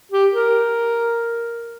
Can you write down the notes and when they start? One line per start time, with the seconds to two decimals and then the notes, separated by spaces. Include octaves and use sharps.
0.12 G4
0.32 A#4